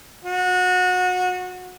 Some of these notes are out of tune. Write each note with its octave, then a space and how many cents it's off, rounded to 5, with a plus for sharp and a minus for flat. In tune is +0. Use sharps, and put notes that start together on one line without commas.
F#4 -25